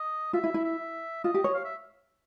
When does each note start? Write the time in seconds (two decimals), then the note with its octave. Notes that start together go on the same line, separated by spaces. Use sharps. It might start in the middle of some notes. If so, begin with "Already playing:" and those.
Already playing: D#5
0.33 F4 E5
0.44 E4
0.54 E4
0.64 E5
1.24 F4 D#5
1.34 G4
1.44 C#5
1.54 F5
1.65 E5